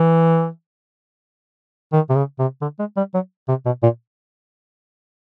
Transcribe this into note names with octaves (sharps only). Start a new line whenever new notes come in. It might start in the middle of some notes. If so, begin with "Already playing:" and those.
Already playing: E3
D#3
C3
C#3
C3
D3
G#3
G3
F#3
C3
B2
A#2